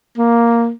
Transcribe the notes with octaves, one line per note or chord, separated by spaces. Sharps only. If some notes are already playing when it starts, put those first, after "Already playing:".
A#3